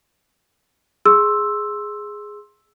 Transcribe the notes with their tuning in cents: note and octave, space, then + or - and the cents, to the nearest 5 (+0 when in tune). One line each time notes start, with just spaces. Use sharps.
G#4 +0 C6 +15 E6 +0